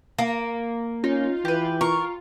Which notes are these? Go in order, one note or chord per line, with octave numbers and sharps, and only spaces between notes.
A#3 A#5
C#4 D#4 F4
E3 G4 B4
F4 A#4 C#6